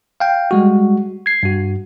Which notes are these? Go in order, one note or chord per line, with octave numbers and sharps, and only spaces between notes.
F5 G5
G3 G#3 F#4
G#6 C7
G2 F#4